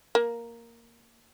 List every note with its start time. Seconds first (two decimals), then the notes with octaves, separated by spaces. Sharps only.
0.15 A#3